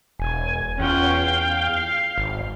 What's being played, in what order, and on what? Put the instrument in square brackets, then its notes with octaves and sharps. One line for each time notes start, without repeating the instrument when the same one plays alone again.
[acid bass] E1 [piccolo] G#5
[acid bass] E2 [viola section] C#4 F4 F#5 [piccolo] G5
[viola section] F5
[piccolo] C7
[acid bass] G#1